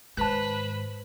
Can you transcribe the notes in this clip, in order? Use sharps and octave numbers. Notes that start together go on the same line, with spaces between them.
G#2 D#3 B4 C5 A5 F#6